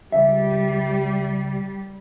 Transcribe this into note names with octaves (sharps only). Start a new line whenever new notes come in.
C#2 G3 E5